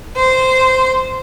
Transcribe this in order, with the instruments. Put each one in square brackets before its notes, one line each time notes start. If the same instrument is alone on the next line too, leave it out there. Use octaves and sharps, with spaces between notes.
[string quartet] C5